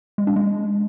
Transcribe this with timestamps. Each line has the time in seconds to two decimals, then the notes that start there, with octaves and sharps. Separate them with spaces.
0.18 G#3
0.27 D4
0.36 G#3